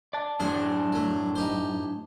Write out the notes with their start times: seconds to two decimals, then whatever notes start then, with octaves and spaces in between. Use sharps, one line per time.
0.13 D5 A5
0.40 F#2 A2 D4 G#4 C5
0.92 F#3 A3
1.35 D#4 G4 C5